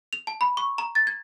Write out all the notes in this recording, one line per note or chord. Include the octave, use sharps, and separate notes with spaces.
F7
A5
B5
C#6
A#5
A6
G#6